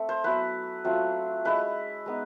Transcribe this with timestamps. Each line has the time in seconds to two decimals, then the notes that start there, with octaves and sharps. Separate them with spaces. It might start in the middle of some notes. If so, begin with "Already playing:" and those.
Already playing: A3 C4
0.09 C5
0.24 F#3 B3 E4 B4
0.85 F#3 A3 C4 F4
1.45 G#3 C#4 E4 B4
2.06 G#3 B3 D#4